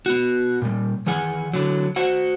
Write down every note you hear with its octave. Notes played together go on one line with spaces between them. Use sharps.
B3 F#4
A#2 G3
D#3 E3 G#4 F#5 G#5
D3 F#3
F#4 C5 F#5